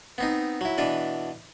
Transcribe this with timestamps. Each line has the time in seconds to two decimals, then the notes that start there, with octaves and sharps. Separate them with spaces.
0.18 B3 C4 D#4
0.61 F#3 E4
0.78 B2 E3 D4 B4